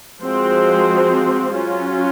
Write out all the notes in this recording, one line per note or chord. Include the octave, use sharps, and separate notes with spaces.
F3 G#3 C4 F#4 C5
F#3 C#4 F4